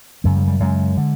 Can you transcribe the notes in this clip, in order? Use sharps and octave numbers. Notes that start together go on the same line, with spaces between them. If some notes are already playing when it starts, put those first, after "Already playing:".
F#2 C#3 G#3
G3
G3
F#2 C#3 G#3
D3